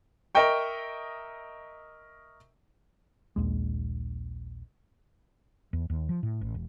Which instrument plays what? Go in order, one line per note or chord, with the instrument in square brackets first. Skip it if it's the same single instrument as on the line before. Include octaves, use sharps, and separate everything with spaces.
[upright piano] A#4 D#5 E5 G5 C#6
[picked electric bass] A#1 D#2 G#3
[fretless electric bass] E2
D#2
F3
A2
A1
E1